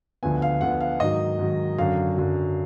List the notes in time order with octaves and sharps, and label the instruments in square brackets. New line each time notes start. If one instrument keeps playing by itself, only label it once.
[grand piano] D2 D3 F3 B3 G#5
F5
D2 D3 F3 B3 F#5
F5
G#2 D#3 F#3 D#5
G#2 D#3 F#3
F#2 D3 F#3 F5
F#2 D3 F#3